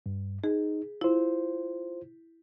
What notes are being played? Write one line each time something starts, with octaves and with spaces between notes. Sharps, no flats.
G2
D#4 G#4
E4 F4 C5